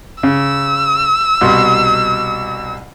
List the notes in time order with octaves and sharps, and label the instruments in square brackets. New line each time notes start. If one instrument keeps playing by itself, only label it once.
[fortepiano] C#3 [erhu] E6
[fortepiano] C2 B2 C6